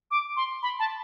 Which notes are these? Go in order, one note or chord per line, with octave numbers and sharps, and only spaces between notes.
D6
C6
B5
A5